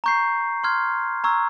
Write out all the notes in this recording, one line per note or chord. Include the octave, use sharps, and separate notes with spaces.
A#5 C#6 G6 C7
C6 F6 G#6
A#5 C#6 E6 G#6